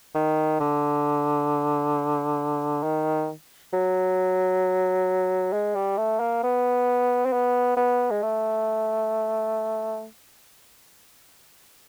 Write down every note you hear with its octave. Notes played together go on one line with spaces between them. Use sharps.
D#3
D3
D#3
F#3
G#3
G3
A3
A#3
B3
C4
B3
B3
G#3
A3